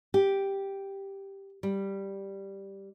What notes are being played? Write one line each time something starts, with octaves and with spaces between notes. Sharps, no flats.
G4
G3